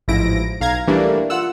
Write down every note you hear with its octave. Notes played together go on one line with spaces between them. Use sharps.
A1 G#2 F3 E4 A#6 D7
B1 F5 A#5 G#6
E3 G3 A3 A#3 D4 E4
F4 F#5 E6